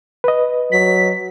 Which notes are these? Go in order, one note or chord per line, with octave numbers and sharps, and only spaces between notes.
B4 D#5
F#3 B6